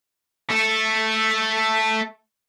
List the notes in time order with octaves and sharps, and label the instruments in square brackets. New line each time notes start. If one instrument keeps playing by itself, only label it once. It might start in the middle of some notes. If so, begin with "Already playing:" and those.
[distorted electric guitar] A3 A4